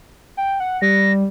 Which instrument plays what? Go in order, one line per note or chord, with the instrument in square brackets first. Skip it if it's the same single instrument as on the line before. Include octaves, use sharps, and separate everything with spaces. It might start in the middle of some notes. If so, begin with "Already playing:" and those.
[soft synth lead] G5
F#5
[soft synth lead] G3 [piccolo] A#6